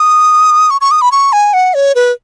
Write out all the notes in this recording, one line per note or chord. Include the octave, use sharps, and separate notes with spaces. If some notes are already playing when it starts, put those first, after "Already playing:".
Already playing: D#6
C#6
C#6
D#6
B5
C#6
G#5
F#5
C#5
B4